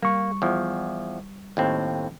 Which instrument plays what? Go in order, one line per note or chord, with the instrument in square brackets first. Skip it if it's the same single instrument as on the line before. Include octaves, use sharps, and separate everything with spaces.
[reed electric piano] G3 C#6 [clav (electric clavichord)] A#3
[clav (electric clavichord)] E2 F3
D#2 A2 C4